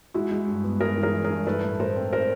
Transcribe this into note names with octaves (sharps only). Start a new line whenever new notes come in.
G#3 E4 F#4
G#3
G2
B3
G#3 G#4 A#4
E3
G#4 A#4
E3
G#4 A#4
G2
A3 A4 B4
A2
A3 A#4 C5
C4
C4 A#4 C5